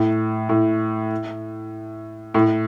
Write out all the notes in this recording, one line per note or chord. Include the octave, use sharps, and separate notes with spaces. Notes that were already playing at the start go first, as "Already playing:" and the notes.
Already playing: A2
A2
A2